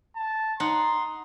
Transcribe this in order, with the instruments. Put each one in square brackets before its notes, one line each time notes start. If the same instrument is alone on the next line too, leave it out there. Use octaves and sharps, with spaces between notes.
[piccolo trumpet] A5
[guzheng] D#4 F#5 [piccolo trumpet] C6